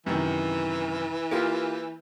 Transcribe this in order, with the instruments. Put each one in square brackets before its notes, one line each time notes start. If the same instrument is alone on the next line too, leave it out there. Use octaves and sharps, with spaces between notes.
[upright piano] F#2 C3 D#3 [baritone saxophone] E3
[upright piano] A#3 F4 G4